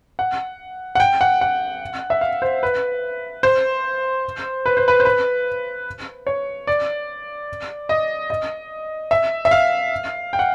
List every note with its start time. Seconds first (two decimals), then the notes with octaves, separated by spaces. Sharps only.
0.19 F#5
0.95 F#5
1.00 G5
1.21 F#5
1.41 F#5
2.10 E5
2.21 F5
2.42 C5
2.63 B4
3.43 C5
4.66 B4
4.77 C5
4.88 B4
5.00 C5
5.05 B4
6.27 C#5
6.67 D5
7.89 D#5
8.30 D#5
9.11 E5
9.45 E5
9.51 F5
10.33 G5
10.39 F#5